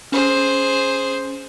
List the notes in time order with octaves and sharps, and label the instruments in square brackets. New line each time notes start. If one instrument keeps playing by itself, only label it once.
[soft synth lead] C#4 [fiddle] G#4 C5